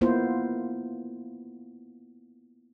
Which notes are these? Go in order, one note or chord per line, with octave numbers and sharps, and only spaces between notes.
A#3 B3 E4 F4 C5